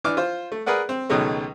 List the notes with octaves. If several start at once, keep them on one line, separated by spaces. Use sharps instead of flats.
E3 D4 D6 F6
F4 C5
A3
G#4 A#4 B4 D5 F#5
C4
C#2 B2 D#3 F#3 G#3 A3